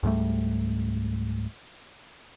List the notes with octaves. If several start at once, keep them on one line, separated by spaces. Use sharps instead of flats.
C#2 G#2 G3 A3